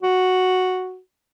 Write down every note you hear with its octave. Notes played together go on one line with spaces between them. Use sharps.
F#4